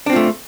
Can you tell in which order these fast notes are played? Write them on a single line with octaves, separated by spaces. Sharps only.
D4 C4 F4 A3